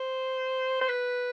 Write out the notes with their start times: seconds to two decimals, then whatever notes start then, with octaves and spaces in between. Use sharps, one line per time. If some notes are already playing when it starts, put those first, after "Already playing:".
Already playing: C5
0.81 C5
0.88 B4